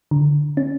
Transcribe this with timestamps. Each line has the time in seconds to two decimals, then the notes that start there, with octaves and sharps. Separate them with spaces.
0.11 D3
0.57 C#4